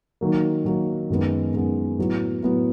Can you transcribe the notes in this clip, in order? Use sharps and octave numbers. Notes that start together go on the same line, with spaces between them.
D#3 F#3 A#3
D#3 F#3 A#3
F#2 D#3 G#3 B3
F#2 D#3 G#3 B3
A2 F#3 B3
A2 F#3 B3